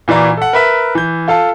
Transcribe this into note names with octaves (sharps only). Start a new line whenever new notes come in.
A#2 E3 F#4 D5 A#5
A4 F#5
A#4 B4 E5
E3 G6
F4 A4 F5 A5